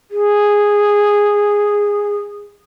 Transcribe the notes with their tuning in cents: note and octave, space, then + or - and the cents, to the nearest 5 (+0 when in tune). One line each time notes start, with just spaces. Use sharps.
G#4 -10